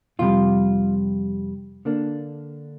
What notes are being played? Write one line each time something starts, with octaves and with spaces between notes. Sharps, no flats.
F2 C3 G3 F4
D3 A#3 D4